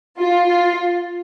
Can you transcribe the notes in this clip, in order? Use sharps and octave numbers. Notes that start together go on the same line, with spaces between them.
F4
F4